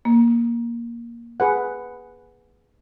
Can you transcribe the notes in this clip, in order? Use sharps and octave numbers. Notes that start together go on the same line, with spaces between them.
A#3
G#4 B4 F#5